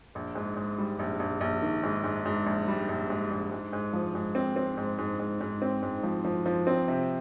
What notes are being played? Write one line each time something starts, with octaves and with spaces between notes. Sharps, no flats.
A#1
G#2
G#2
G3
A#1
A#1
A#1
D#3
G#2
G#2
G#2
A#1
G3
A#1
G#2
A#1
G#2
G#2
F3
G#2
C4
C4
G#2
G#2
G#2
G#2
C4
G#2
F3
F3
F3
C4
C3